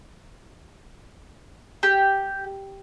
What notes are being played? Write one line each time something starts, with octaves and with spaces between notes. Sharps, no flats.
G4